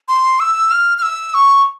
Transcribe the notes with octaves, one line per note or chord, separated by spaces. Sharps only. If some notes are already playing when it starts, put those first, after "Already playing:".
C6
E6
F6
F6
E6
C#6